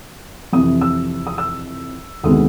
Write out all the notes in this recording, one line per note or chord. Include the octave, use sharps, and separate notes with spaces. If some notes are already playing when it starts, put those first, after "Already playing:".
F2 C3 E3 D#6
E6
D#6
E6
D2 C3 D#3 G#3 B3 D#6